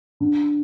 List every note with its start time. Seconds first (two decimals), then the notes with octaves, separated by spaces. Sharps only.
0.20 D3